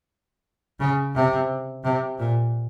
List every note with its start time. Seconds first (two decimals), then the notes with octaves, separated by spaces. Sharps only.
0.80 C#3
1.15 C3
1.84 C3
2.19 A#2